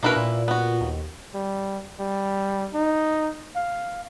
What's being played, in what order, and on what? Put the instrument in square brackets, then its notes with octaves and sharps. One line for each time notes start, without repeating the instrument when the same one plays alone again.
[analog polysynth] B2 D4 A#4 [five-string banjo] A#3 E4 B4
[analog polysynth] A#2
[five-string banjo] B3 F#4
[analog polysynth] D#2
[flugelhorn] G3
G3
D#4
F5